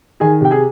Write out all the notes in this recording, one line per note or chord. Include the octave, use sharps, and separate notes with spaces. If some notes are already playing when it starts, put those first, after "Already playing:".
D#3 G#4 G#5
C3 G5
G#4 G#5